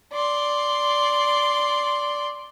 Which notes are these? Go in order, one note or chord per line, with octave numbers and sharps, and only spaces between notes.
D5 C6